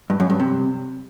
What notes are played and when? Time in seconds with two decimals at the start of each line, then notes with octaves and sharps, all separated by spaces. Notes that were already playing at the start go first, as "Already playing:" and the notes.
0.10 G2
0.20 F#2
0.30 G2
0.40 C3